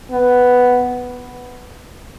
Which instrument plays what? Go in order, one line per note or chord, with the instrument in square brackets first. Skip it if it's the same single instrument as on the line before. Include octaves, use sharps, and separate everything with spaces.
[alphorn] B3